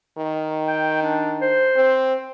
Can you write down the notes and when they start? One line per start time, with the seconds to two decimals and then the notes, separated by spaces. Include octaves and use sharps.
0.18 D#3
0.67 G5
1.02 D4
1.41 C5
1.76 C4